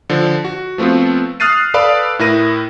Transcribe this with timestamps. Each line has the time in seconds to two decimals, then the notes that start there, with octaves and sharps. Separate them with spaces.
0.10 D3 F3
0.44 F#4
0.78 F3 A3 B3 C4 F4
1.40 D#6 F6 F#6 A6 C7 D#7
1.74 A4 B4 D5 F5 B5
2.19 A2 E4 A#4 A#6 D#7